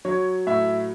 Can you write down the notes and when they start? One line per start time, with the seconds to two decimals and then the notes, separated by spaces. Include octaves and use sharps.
0.05 F#3 C#5
0.47 A2 E5